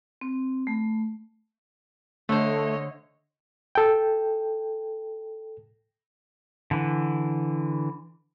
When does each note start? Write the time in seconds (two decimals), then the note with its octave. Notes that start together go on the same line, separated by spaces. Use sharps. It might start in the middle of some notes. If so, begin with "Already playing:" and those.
0.21 C4
0.67 A3
2.29 D3 A3 C5 C#5 D#5
3.75 A4 G5
6.71 D3 E3